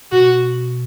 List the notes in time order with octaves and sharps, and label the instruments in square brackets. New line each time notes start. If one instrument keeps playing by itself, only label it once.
[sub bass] B2 [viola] F#4